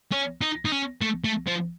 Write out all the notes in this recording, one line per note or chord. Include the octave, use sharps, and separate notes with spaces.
C#4
D#4
D#4
C#4
A3
A3
F3